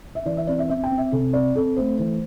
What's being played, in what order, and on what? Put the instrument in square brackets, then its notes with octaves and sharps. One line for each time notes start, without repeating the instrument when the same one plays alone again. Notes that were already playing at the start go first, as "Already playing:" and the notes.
[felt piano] E5
E3 D5
E5
C4 D5
E5
C4 E5
G5
C4
E5
C3 A4
C4 D5
C4 A4
A3 C5
E3 C5